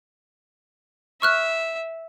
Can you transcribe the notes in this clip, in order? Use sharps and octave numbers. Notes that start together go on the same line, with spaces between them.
E5 C#6 F6 F#6